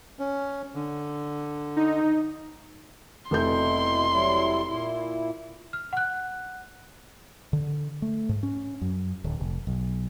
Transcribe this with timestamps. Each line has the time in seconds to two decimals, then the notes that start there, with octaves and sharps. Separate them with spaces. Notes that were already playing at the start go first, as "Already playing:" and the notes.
0.19 C#4
0.75 D3
1.76 D#4
3.31 F1 B2 E4 A4 C6 G6
4.11 F#3 G3 E4
4.66 A#2 E4
5.73 F6
5.93 F#5 F#6
7.53 D3
8.02 A3
8.29 G#2
8.43 C#4
8.81 F#2
9.24 D1
9.40 F1
9.67 B1